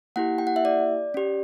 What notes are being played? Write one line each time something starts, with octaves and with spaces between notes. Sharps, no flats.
A#3 E4 G4 F#5
G5
F#5
E5
D5
C#4 G4